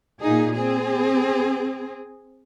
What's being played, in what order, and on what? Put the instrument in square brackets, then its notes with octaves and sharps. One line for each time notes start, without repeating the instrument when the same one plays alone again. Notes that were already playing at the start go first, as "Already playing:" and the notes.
[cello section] A#2 D#4 G#4
C4 G#4